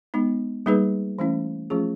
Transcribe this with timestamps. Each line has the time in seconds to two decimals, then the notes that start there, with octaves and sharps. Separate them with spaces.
0.14 G#3 B3 D#4
0.66 G3 A#3 D#4 G#4 B4
1.19 E3 A3 C#4 E4
1.70 F3 A3 C#4 F4 G#4